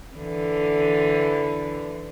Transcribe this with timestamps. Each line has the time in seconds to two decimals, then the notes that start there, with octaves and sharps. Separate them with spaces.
0.16 D3 E3